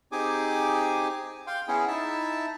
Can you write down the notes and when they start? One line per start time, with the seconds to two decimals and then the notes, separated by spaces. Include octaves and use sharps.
0.12 C4 D#4 G4 G#4 G#5 D6
1.47 F5 G5 C6
1.68 B3 C#4 E4 G#4
1.88 D#4 E4 E5 A5